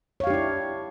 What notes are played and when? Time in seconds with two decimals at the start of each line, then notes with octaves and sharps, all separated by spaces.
0.20 C#5
0.24 F5
0.27 G4
0.30 D4
0.34 E4